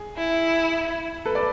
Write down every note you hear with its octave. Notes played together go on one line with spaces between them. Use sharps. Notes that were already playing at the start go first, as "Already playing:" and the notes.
Already playing: G#4
E4
A4 B4
D5